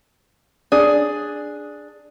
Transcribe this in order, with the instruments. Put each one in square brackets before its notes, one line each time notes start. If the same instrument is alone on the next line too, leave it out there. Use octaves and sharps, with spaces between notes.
[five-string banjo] D4 G#4